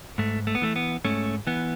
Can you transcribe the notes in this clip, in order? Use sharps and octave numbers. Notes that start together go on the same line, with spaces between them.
G#2 A3
A3
B3
E3 A3
B3
G#2 A3 C#4
E3 B3